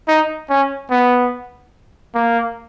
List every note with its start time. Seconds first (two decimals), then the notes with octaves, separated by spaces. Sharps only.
0.08 D#4
0.50 C#4
0.90 B3
2.15 A#3